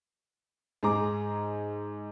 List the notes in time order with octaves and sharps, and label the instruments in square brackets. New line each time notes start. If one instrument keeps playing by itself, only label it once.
[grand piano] G#2 G#4 A#5 D6